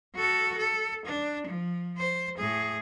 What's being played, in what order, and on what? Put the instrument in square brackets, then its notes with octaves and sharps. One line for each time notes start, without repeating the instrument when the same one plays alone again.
[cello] F#4 A4
A4
D4
F3
C5
A2 G#4